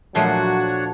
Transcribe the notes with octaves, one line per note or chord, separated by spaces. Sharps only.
A#2 F3 F#3 A3 D4 F#4 C#5 F#5